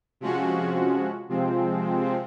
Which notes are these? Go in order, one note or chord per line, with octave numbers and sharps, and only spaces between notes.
C3 F3 G#3 C#4 F#4
C3 F3 G#3 C4